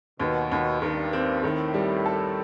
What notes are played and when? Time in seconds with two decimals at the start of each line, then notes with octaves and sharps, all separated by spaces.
0.20 D#2 B2
0.51 D#2
0.82 G2 D#3
1.13 C4
1.43 A2 D#3
1.74 G3
2.06 A4